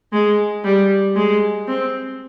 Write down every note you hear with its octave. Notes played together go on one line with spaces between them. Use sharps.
G#3
G3
G#3
C4